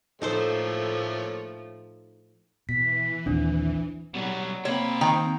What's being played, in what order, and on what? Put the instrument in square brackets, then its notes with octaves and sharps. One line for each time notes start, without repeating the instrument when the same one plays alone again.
[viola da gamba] A2 F3 [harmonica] A3 A#3 C#5 [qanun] D#4 A4 C5
[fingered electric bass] B2 [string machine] E3 [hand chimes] B6
[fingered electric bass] A#1 D#2 [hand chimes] C4 D4
[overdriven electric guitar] B2 G3 [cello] F#3
[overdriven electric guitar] C3 B4 [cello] A#3 [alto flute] C4 [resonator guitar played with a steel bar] C#5
[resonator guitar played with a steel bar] D#3 G5 A#5